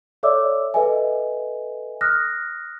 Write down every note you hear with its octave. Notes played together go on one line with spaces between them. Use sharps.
A4 C#5 D5 E5 D6 E6
A4 B4 D#5 E5 G#5
D#6 F6 F#6 A#6